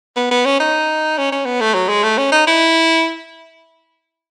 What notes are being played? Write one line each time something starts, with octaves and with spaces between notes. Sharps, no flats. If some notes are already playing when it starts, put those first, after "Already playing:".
B3
B3
C#4
D#4
C#4
C#4
B3
A3
F#3
G#3
A3
C#4
D#4
E4